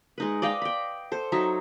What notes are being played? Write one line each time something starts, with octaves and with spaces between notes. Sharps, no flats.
G#3 D#4 B4
D5 D#5 F5 G5
G5 B5
A4 C5
F#3 D#4 E5